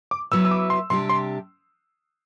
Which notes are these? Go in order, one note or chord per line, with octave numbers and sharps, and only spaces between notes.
D6
F#3 B3 E4 B4 E6
E6
D6
C6
C3 G3 D4 G4 C6
C6